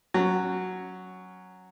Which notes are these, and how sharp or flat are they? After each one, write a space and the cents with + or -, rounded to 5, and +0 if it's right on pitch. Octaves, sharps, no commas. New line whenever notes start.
F#3 +0 C#4 +0